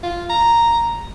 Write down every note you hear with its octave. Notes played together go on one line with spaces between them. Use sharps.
F4
A#5